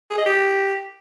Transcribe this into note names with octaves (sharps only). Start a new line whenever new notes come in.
G#4
D#5
G4